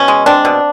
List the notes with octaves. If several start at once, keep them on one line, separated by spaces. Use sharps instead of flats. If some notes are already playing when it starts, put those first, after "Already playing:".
Already playing: B2 C#4
G#3
C4 D4
B2